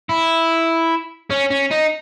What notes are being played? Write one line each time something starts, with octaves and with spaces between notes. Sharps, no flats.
E4
C#4
C#4
D#4